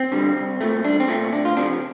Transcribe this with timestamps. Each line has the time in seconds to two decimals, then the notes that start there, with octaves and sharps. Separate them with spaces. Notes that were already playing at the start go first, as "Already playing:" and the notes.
Already playing: C4
0.12 D3 G3
0.36 C2
0.61 A#2 A3
0.84 C2 D4
1.00 C4
1.08 A#2 A3
1.32 D2 D4
1.45 F4
1.57 C3 F3 D4